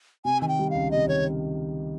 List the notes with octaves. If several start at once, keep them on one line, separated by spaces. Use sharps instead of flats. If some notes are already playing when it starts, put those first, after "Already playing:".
C3 G#5
D#3 G#5
G5
G3
C#2 F5
C3 D#5
D#3 C#5